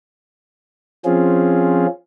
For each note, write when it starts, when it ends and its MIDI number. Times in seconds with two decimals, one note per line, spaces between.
1.05 1.87 53
1.05 1.87 60
1.05 1.87 61
1.05 1.87 65
1.05 1.87 68